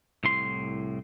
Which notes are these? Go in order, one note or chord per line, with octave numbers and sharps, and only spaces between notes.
C2 A2 C6